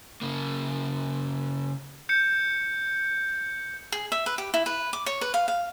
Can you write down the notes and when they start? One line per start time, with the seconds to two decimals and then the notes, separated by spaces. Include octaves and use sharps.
0.22 C#3 A#3
2.09 G6 C#7
3.92 G#4
4.12 E5
4.26 B4
4.38 G4
4.54 E4
4.66 B4
4.93 D6
5.06 C#5
5.21 B4
5.34 F5
5.48 F5